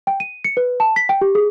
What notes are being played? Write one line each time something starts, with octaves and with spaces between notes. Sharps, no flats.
G5
D#7
C#7
B4
A5
B6
G5
G4
G#4